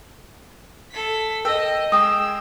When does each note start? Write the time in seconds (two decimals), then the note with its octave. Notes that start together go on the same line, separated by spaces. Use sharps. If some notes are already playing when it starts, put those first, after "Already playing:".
0.92 A4 B6
1.45 A#4 D#5 G5 E6
1.92 G#3 G#4 G5 D#6 E6